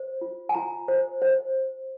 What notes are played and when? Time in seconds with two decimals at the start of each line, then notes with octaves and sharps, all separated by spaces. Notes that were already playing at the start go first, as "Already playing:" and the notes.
Already playing: C5
0.21 F4
0.49 G#5
0.55 F4 A#5
0.88 C5
1.22 C5